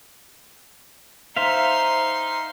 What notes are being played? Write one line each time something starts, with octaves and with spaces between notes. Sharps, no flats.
D#4 C5 E5 F5 C6